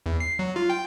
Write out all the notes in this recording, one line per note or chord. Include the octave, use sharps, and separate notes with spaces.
E2
C7
F#3
F4
G5